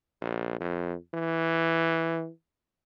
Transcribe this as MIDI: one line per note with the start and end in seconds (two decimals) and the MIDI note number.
0.21 0.58 34
0.60 0.95 41
1.14 2.29 52